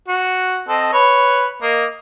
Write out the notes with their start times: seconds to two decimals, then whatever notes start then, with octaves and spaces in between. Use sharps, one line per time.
0.08 F#4
0.68 C4 A4 D#5
0.93 B4 C#5 B5
1.62 A#3 D#5